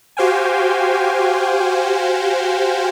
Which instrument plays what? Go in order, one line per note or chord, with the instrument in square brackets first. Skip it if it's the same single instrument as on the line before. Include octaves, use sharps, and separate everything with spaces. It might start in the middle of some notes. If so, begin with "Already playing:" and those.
[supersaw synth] F#4 G4 C5 F5 G5 G#5